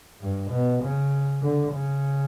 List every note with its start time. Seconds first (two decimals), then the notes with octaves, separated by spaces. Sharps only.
0.21 G2
0.51 B2
0.82 C#3
1.42 D3
1.73 C#3